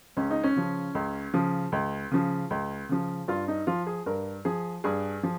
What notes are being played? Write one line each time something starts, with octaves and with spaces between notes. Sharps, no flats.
C#2 C#4
D#4
C#4
C#3 F3
C#2
C#3 F3
C#2
C#3 F3
C#2
C#3 F3
G2 F4
D#4
F3 F4
G#4
G2 A#4
F3 G#4
G2 G#4
F3